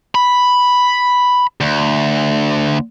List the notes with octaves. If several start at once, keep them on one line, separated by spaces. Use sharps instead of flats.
B5
D2